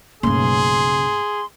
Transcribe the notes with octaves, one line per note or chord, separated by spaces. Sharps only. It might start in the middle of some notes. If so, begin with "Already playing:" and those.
B1 G2 C#3 A3 A#3 G#4 C6